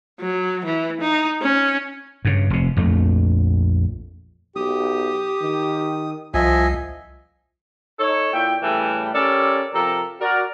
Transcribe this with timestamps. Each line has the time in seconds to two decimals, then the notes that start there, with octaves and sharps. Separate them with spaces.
0.20 F#3
0.65 E3
1.01 D#4
1.42 C#4
2.25 G2 C#3
2.50 F1 C3
2.77 A#1 F2 A3
4.56 B1 G4 D#6
5.41 D#3
6.34 C2 F3 D#5 E5 G#5
7.99 D#4 A4 C#5
8.34 A#2 E4 E5 G5
8.62 A2 C#3 E3 G3 A4 G5
9.14 C#4 G4 A4 A#4 D5
9.74 C3 F3 G4 A4 A#4
10.21 F#4 A#4 D5